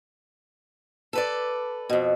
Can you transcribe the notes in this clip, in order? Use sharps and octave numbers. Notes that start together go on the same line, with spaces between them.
A4 B4 D5
F2 B2